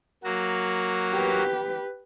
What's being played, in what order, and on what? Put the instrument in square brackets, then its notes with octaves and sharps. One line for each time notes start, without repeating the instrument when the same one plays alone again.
[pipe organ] F#3 A#3 F#4
[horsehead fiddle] G4 B4